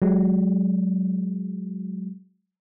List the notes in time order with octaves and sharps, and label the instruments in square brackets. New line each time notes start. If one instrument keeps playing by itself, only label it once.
[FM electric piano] F#3 G#3